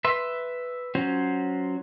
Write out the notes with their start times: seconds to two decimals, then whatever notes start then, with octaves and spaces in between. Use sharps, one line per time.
0.05 B4 E5 C6
0.95 F#3 C#4 F4 F#4 C5